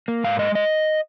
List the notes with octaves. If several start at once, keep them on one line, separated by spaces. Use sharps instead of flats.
A#3
G#2 F5
G#3 D#5
D#5